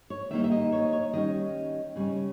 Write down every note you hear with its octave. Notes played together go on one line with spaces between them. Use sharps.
C#5
D#3 G3 A#3 D#4 E5
E5
D#5
C#5
C#5
D#3 G3 C#4 D#5
C#3 G3 C#4